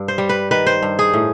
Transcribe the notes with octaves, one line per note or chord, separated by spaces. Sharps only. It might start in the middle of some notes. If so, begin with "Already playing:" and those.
Already playing: G2
C5
G3
B4
D#3 B4
C5
G2
G#4
A2